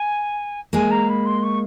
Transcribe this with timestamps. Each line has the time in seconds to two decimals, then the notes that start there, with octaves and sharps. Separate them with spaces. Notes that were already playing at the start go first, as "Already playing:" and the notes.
Already playing: G#5
0.73 G#3 A#3 G#5
0.90 A#5
1.08 B5
1.25 C6
1.42 C#6